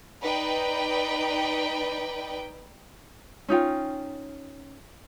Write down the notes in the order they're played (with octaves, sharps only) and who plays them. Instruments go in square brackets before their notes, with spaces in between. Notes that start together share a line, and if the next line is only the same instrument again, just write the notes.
[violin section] D#4 B4 D5 G5
[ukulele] C#4 D#4 F4 G5